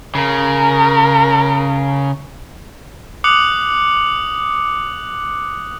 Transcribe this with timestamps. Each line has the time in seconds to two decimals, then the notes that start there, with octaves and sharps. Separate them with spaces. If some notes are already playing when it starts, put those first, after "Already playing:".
0.15 C#3 A#4
3.24 D6 D#6 F#6 C#7 F#7